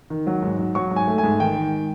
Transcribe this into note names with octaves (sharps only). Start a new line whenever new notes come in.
D#3
F#3
G#2
F#3
F#3 C#6
G#2
G#5
A3
G#5
G#2
D#3 G5
D#3